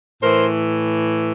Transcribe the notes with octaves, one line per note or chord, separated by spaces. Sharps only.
A2 E3 A#4 C5